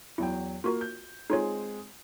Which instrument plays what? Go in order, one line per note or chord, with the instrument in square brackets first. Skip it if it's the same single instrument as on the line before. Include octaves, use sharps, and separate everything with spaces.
[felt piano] E2 F#3 G5 [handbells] E4
[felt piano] A#3 [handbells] F4 F#4 A#4
[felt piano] G6
[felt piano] G#3 C4 G#4 [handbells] D#4 F4 C#5